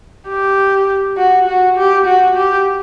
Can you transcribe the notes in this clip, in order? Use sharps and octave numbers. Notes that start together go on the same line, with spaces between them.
G4
F#4
F#4
G4
F#4
G4